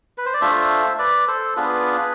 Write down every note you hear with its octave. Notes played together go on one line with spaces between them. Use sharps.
B4
C5
D5
A3 D4 F4 C5 E5
B4 D5
A4 C5
B3 D4 F4 G#4 B4